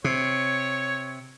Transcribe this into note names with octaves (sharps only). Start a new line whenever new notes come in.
C3 C#5